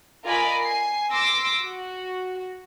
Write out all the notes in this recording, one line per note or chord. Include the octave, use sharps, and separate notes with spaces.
F4 A#4 D5 D#5 G#5 B5
G#5 C7
C6 D6 E6 A#6
F#4